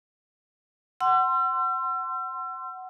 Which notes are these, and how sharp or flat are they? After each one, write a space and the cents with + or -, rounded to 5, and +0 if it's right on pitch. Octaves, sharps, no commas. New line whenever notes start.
F#5 +15 C6 +0 E6 +40